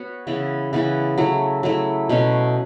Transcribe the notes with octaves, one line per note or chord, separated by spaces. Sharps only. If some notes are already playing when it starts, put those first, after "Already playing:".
Already playing: B3 F#4 C#5
C#3 E3 B3 E4
C#3 E3 B3 E4
F#3 A3 E4
F#3 A3 E4
B2 A3 C#4